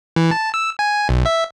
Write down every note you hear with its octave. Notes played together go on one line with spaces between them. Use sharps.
E3
A5
E6
G#5
B1
E5